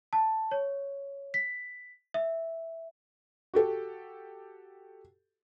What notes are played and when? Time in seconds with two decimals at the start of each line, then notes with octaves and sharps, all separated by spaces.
0.13 A5
0.51 C#5
1.34 B6
2.14 E5
3.54 F#4 G4 A4